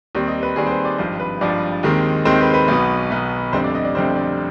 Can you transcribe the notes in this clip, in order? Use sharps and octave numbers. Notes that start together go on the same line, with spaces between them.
D#2 D#3 G3 C4
D#5
B4
D#2 D#3 G3 C4 G#4
C5
B4
D5
G#1 G2 F3 C5
B4
G#1 G2 F3 D5
D#2 D#3 G#3 C4
D#2 D#3 G#3 C4 C5
B4
B4
B1 B2 B3
B1 B2 B3
F1 F2 D3 G3 C4 C5
D5
D#5
D5
F1 F2 D3 G3 C4 C5
D5